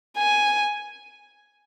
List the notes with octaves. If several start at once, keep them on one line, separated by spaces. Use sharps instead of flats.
G#5